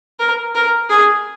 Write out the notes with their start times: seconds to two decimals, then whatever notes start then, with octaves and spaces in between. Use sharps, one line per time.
0.19 A#4
0.54 A#4
0.90 G#4